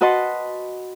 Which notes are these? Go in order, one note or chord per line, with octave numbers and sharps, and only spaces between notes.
F#4 B4 D#5 F#5 A5 C6